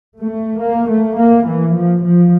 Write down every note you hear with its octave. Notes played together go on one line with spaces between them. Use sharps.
A3
A#3
A3
A#3
E3
F3
F3